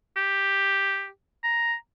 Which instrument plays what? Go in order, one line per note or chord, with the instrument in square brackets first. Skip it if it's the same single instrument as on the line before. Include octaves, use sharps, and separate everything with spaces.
[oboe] G4
A#5